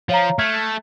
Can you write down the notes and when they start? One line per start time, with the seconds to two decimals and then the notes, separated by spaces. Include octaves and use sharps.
0.09 F3 C#5 F5 A#5
0.39 A3 F6 G#6